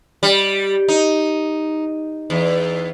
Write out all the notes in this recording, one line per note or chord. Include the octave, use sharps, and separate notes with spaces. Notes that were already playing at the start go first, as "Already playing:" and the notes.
G3
D#4
E2